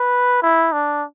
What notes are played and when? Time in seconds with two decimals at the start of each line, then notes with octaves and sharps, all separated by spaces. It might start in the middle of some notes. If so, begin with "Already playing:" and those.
Already playing: B4
0.42 E4
0.72 D4